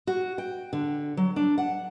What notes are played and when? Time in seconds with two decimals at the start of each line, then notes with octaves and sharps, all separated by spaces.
0.07 F#4
0.38 G5
0.73 D3
1.17 F#3
1.36 D4
1.58 F#5